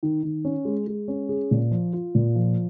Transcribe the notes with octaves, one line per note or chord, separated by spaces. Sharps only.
D#3
D#3
C#4
G#3
G#3
C#4
G#4
A#2
F3
F4
A#2
F3